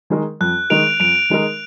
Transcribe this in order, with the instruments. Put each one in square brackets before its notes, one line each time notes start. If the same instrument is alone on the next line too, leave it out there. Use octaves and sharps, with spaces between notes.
[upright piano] D#3 G#3 D#4 A#4
[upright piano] F2 [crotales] F#6
[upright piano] D#3 G#3 D#4 A#4 [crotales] D7 F7
[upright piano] F2 [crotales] D7 F7
[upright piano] D#3 G#3 D#4 A#4